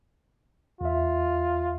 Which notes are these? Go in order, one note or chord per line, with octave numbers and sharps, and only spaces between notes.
E2 F4 E5